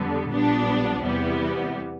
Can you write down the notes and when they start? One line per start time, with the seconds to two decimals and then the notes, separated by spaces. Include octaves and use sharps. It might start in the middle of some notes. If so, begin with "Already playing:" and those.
Already playing: F2 D3 G3 B3
0.31 A#1 A#2 G3 B3 D4
1.03 E2 C3 E3 G3 B3